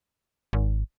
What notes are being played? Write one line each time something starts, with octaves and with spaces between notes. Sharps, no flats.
G#1